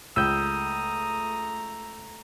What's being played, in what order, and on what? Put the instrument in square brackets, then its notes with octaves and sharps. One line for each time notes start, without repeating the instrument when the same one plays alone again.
[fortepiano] C#2 [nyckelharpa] A3 A#5 [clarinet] D#6 [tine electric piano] E6 G6